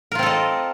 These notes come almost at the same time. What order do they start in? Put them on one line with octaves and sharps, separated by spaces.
A#4 F4 C4 A4 D#5